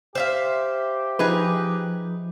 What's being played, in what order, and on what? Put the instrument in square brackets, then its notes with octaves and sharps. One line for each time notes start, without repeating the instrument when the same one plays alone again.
[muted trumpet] G4 [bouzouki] C5 E5 F5
[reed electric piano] F3 [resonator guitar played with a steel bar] D#4 G#4 B4